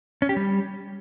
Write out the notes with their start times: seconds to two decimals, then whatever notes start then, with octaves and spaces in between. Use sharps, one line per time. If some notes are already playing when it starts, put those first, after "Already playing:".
0.22 C#4
0.29 G4
0.36 G3